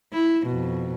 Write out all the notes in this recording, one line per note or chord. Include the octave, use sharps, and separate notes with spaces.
E4
F2 B2